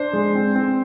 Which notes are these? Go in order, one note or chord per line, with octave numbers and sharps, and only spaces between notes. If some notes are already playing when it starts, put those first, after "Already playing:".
Already playing: D4 C5
G#3
C4
C4